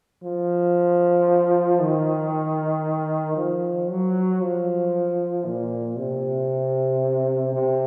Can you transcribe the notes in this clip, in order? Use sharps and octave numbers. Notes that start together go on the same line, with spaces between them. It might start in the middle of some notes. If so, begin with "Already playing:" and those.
F3
D#3
F3
F#3
F3
A#2
C3
C3